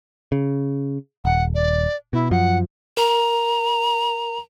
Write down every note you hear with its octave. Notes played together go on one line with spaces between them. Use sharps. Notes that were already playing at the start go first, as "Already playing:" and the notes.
C#3
D#1 F#5
D5
B2 E4
F#2 F3 F#5
A#4 A#5